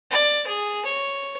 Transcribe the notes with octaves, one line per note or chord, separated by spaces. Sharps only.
D5
G#4
C#5